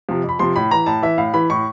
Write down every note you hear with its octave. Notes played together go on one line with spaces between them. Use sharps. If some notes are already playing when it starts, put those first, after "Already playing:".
C3 F3
F2 B5
C3 F3 C6
A2 B5
E3 A#5
A2 A5
E3 E5
A2 F5
E3 B5
A2 C#6